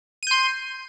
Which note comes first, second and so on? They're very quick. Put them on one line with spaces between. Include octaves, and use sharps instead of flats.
D#7 G6 C6